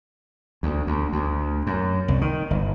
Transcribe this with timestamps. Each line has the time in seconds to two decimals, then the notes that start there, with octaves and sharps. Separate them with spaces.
0.63 D2
0.87 D2
1.12 D2
1.67 F#2
2.08 C2
2.21 D#3
2.50 G1